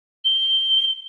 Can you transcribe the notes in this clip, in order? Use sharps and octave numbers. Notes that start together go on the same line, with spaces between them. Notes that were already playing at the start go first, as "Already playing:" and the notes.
G7